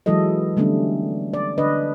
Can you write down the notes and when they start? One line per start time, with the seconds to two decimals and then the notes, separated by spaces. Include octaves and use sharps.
0.06 E3 F#3 G#3 E4 A4 D#5
0.57 D3 G3 A3 B3 C#4 D4
1.34 D5
1.58 D3 D4 B4 D#5